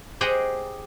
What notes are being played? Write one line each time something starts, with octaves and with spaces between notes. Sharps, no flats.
G4 G#4 C5 D#5 F#5 G5